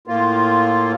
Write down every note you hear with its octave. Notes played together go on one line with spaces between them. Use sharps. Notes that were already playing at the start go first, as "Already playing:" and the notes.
A2 A#3 F4